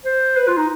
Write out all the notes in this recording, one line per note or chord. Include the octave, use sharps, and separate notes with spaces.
C5
B4
F4
D#4